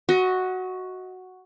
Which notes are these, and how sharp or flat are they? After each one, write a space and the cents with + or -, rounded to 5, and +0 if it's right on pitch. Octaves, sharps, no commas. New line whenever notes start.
F#4 +0 D#5 +35